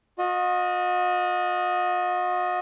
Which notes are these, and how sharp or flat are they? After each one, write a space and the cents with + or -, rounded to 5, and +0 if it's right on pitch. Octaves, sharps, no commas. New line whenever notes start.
F#4 -45 D#5 +0